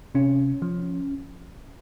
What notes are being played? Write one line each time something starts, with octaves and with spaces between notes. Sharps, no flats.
C3 C#4
F3